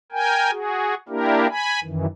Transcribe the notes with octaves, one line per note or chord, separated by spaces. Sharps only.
A#4 G5 G#5
F#4 G#4
A#3 D4 E4 G4 A#4
G#5 B5
F#2 D#3 E3